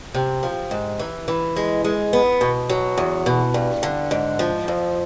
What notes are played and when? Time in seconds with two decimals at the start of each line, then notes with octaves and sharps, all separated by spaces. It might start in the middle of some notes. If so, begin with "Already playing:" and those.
0.14 C3
0.43 F3
0.71 G#2
0.99 E3
1.28 E3
1.56 G#3
1.84 G#3
2.13 B3
2.41 B2
2.69 F#3
2.98 E2
3.26 B2
3.54 G2
3.83 D3
4.11 G#2
4.39 F3
4.68 F2